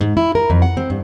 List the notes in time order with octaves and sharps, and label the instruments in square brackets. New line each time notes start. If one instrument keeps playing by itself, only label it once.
[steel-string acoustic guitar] G#2
E4
A#4
F2
F#5
C4
G2